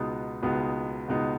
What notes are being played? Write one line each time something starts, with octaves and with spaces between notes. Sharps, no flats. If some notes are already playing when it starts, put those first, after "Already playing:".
Already playing: C#2 B2 G#3 B3 D#4
C#2 B2 G#3 B3 D#4
C#2 B2 G#3 B3 D#4